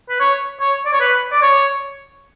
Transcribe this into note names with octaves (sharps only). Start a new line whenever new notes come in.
B4
C#5
C#5
D5
C#5
B4
D5
C#5